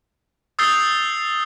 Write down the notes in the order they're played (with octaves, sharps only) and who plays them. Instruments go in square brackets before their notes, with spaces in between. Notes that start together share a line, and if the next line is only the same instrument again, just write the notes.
[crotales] D#6 E6 G6 A6 C7 G7